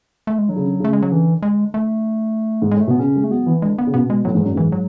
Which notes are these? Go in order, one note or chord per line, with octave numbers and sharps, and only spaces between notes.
A3
G#3
D3 F#3
C#3
D3
C#3 A3
G#3
F#3
D3 E3
G#3
A3
G#2
A2 G#3
A3
B2 B3
C#3 C#4
G#3
A3
F#3 B3
E3
D3 G#3
B3
C#3
B2 B3
G#3
A2 F#3
G#2 E3
F#2 F#3
G#2 E3
F#3